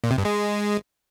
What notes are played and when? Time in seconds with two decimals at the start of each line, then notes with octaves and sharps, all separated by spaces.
0.04 A#2
0.11 C3
0.18 G2
0.25 G#3